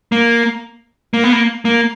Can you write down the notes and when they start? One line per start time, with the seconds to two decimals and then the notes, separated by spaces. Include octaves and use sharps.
0.12 A#3
1.14 A#3
1.24 B3
1.32 A#3
1.65 A#3